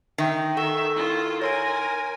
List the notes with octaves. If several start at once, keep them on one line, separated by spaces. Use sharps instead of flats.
D#3 E5 G5
A4 E5 F#5 C#6
E4 F4
A#4 C#5 G#5 C6 D7